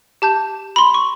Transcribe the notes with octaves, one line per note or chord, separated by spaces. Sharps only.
G4 A5 G6
B5 C6
C#6